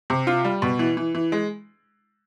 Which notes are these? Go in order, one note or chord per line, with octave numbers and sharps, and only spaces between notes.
C3
F4
G3
B2
E3
E3
E3
G#3